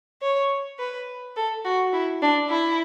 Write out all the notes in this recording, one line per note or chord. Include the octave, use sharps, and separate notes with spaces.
C#5
B4
A4
F#4
E4
D4
E4